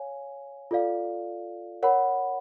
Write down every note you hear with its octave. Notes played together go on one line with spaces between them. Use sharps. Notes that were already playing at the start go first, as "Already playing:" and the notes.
Already playing: C#5 F5 G#5
F4 A4 D5 F5
A#4 C#5 F#5 B5